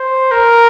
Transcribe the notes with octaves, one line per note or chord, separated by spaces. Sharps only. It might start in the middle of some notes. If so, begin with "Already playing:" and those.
Already playing: C5
A#4